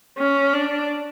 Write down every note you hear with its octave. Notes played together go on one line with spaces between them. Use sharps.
C#4
D4